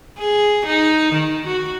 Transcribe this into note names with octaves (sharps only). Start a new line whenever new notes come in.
G#4
D#4
D#3
F#4